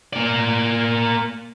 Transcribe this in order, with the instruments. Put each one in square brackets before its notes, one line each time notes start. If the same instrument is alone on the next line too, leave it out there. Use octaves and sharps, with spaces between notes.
[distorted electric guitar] A#3 D5